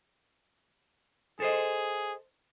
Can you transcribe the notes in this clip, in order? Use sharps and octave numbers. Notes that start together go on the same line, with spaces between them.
G#4 A4 C5 D#5